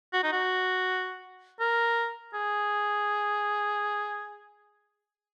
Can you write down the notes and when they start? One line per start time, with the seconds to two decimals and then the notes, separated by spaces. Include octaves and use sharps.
0.13 F#4
0.23 D#4
0.32 F#4
1.60 A#4
2.34 G#4